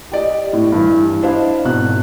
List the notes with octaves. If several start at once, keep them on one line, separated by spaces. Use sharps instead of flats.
G4 D5 D#5
A2
G2 E3
D4 E4 C5 D#5 F5
G#1 B2 F#6